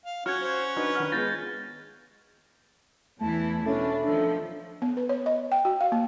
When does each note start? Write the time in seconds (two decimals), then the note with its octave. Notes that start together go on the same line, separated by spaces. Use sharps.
0.05 F5
0.26 C#4 F#4 C#5 F6 G#6
0.41 C5
0.77 D4 D#4 F#4 B4
0.95 D#3 D4 F#5 F6
1.12 G#3 B3 F4 G6 A6 A#6
3.20 E2 E3 A3 E4 A5
3.66 B2 A3 C#4 D4 B5
4.04 D#3 F3 D4 A4
4.82 B3
4.97 B4
5.09 C#5
5.26 D#5
5.52 G5
5.65 F#4
5.81 F5
5.92 A#3